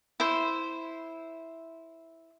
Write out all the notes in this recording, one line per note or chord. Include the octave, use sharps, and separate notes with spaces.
E4 C5